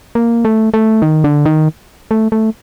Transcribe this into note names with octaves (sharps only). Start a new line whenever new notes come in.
A#3
A3
A3
D#3
D3
D#3
A3
A3